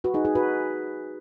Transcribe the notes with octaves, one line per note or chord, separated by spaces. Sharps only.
F#4 B4
D#4 G#4
D#4 G#4
F#4 B4